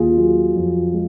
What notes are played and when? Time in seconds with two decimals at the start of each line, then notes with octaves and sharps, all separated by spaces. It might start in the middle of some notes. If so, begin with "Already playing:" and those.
Already playing: D#2 F4 G#4
0.17 F#3
0.55 F2
0.93 G#3